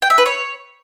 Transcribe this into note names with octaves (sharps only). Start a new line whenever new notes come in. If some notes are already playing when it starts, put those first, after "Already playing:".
G5
E5
B4
C#5